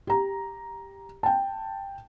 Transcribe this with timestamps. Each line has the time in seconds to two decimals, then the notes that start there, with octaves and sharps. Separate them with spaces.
0.07 G4 A#5
1.23 G5 A5